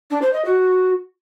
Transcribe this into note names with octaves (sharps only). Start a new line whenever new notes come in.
D4
C5
D#5
F#4